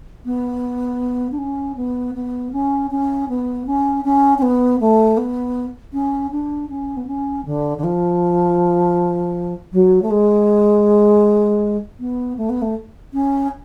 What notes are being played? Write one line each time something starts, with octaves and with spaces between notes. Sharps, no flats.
B3
D4
C#4
B3
B3
C#4
C#4
B3
C#4
C#4
C#4
B3
A3
B3
C#4
D4
C#4
B3
C#4
D3
D3
F3
F#3
A3
G#3
B3
A3
B3
A3
C#4